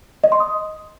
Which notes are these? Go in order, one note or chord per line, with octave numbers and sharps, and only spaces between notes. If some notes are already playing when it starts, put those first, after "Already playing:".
D#5
C6
D#6